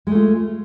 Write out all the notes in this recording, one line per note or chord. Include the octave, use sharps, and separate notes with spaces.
G#3 A3 F4